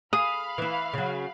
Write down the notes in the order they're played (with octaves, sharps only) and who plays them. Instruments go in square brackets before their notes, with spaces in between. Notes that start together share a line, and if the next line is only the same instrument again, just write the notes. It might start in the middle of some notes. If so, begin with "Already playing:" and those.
[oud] G#4 [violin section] F5 B5 [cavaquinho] D#6
[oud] E3 E4
C#3 F#3